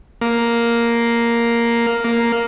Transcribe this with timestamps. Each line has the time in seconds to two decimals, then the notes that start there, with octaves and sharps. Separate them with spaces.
0.21 A#3
2.04 A#3